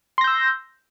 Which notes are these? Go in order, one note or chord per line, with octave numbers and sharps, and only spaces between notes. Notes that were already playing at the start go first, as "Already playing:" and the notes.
C6 E6 G6 A#6